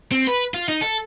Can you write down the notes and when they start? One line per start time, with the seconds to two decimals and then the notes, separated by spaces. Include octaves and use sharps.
0.12 C4
0.27 B4
0.54 F4
0.69 D#4
0.81 A4